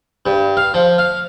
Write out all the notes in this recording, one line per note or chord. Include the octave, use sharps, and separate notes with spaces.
G2
F5
F3
F5